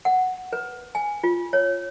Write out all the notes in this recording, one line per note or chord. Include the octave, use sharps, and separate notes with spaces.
F#5
B4
G#5
F4
C#5